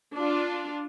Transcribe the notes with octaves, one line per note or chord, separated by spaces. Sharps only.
D4 F4